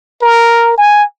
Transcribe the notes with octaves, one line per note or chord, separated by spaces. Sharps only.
A#4
G#5